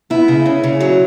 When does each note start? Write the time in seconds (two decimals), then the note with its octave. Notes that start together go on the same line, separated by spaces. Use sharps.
0.10 B3 E4
0.28 C#3
0.46 C#3
0.63 C#3
0.81 F#3